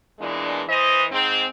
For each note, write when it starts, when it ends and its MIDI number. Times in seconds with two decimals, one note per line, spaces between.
0.19 0.62 40
0.19 0.62 46
0.19 0.62 52
0.19 0.62 56
0.19 0.62 62
0.68 1.04 52
0.68 1.04 72
0.68 1.04 75
1.11 1.45 44
1.11 1.45 60